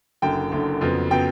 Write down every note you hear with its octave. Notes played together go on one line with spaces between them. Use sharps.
F#1 F#2 D3 G5
F#1 F#2 D3
F2 C#3 F#3 B3
C#3 F#3 B3 G5